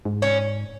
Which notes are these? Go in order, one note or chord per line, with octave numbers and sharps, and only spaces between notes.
G#2
C#4